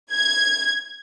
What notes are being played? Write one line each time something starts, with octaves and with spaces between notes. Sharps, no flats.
G#6